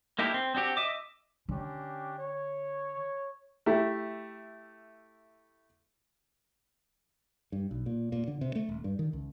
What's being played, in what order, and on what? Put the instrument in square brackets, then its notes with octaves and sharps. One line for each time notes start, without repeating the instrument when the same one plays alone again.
[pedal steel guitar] A#3 D#4 E4 G4 A4
C4
C4 D4 F#4 G4
D#5 E5 D6
[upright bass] D3 [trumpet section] C#4 D4 G4
[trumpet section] C#5
[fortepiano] A3 E4 G4
[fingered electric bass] G2
B1
A#2
A#2
D3
C3
A3
D#1
G2
D#3
C#2